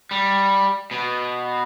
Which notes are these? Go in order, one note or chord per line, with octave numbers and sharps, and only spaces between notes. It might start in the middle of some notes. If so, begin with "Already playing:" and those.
G3
B2